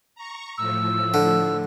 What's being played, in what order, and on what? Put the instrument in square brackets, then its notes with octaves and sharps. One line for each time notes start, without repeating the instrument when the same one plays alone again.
[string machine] A#5 C#6
[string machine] A2 F3 [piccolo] E6
[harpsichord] D3